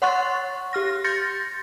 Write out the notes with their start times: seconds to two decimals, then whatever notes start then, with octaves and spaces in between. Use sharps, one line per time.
0.02 C#5 F#5 C6 C#6 F#6 A6
0.73 G4 F6 A#6
1.04 C6 G6 A6 A#6 C#7